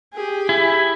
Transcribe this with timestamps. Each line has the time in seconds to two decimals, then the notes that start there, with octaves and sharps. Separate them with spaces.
0.14 G4 G#4
0.49 E4